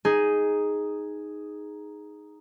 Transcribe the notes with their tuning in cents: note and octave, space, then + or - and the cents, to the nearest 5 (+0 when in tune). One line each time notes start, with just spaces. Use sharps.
D#4 +0 G#4 +0